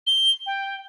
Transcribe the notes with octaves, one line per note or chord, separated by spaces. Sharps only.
G7
G5